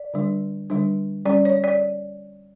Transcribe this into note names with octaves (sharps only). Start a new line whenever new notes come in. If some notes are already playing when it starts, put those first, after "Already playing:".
Already playing: D5
D3 G3 D4
D3 G3 D4
G3 C#4 D5
C#5
D5